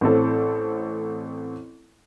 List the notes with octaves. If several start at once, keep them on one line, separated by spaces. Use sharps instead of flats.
A1 C4 A4